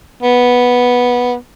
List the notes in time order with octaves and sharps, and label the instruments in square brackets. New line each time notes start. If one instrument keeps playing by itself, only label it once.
[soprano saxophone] B3